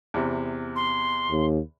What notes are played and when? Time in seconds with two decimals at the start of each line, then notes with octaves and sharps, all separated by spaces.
0.14 E2 C3
0.76 C6
1.31 D#2